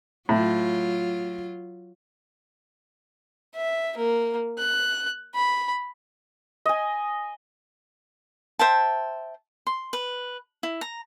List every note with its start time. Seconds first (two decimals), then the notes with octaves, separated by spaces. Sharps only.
0.29 A2 F#3 F4
3.55 E5
3.97 A#3
4.58 F#6
5.35 B5
6.66 D#5 G#5
8.59 C5 E5 G5 A5
9.67 C6
9.93 B4
10.63 E4
10.81 A#5